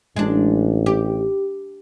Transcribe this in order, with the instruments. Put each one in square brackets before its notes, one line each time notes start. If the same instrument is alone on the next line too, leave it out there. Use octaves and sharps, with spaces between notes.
[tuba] A1 [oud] G#3 D4
[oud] G4